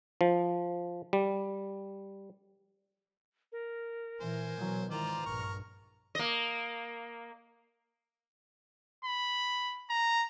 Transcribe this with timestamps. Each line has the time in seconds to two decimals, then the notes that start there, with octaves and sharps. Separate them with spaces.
0.21 F3
1.13 G3
3.52 A#4
4.20 A#2 E3 C5 G#5
4.57 B2 E3 F#3
4.91 G#2 D#3 E3 F4 C5 D5 A#5
5.26 A#1 G2 A#4 C#6 F6
6.15 A#3 D#5
9.05 B5
9.90 A#5